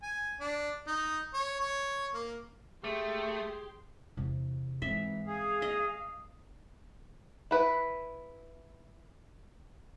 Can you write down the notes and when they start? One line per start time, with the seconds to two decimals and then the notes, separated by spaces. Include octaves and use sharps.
0.03 G#5
0.40 D4
0.87 D#4
1.34 C#5
1.60 C#5
2.14 A#3
2.84 A3 G4 G#4 C6
4.17 E2 C3
4.82 G#2 E3 C4 E5
5.27 G#4 F5
5.62 D#5
7.51 E4 B4